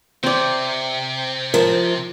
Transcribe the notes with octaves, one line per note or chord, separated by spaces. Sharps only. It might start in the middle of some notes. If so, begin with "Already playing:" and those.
C3 C4 D5
F3 A#4